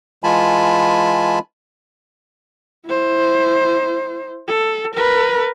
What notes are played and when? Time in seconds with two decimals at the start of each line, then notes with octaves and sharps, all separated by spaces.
0.24 E3 G#3 F4 G#5 A5 B5
2.87 E4 C5
4.48 A4
4.95 A#4 B4